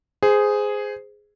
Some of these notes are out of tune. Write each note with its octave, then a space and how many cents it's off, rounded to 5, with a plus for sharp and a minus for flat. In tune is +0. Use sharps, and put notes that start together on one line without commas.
G#4 +0 C5 -20